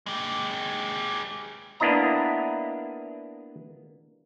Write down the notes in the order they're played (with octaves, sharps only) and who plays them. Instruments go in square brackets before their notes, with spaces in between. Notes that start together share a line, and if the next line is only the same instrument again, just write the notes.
[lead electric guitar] G#3 G4
[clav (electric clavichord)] A#3 B3 D4 E4 D#5 A#5